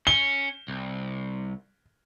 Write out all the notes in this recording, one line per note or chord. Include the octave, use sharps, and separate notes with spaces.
C#4 G7
C2